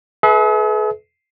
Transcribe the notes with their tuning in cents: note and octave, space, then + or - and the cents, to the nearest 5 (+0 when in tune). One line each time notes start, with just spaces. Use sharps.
G#4 +45 B4 +0 E5 -30